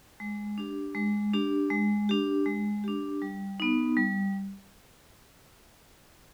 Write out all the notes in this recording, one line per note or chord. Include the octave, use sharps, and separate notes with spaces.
G#3
D4 G4
G#3
D4 G4
G#3
D4 G4
G#3
D4 G4
G3
B3 D#4
G3